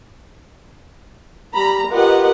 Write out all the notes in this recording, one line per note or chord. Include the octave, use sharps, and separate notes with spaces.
G3 A#5 B5
F4 G4 A#4 B4 D#5 F#5